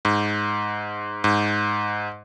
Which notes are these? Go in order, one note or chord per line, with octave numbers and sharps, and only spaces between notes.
G#2
G#2